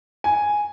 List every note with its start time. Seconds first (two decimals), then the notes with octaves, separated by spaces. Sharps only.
0.24 G#5